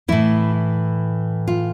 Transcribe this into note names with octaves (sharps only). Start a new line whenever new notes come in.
A2 E3 E4
F4